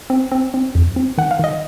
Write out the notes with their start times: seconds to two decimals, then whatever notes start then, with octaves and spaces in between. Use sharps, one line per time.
0.10 C4
0.32 C4
0.54 C4
0.75 F2
0.96 C4
1.18 D#3 F#5
1.31 F5
1.39 D#3 D#5